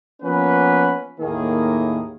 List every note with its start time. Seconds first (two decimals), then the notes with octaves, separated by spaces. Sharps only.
0.22 F3 A#3 B3 C#4 B4
1.19 D#2 A2 D#3 A#3 G#4